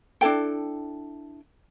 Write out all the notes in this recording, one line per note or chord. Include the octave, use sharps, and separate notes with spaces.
D4 E4 A4 G5